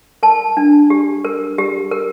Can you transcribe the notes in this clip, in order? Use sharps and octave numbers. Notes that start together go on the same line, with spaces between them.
A#4 A5
D4
G4
A#4
G4
A#4